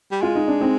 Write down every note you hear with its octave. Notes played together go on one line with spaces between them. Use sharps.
G3
G#3 F4
D#4
D4
C4 D#4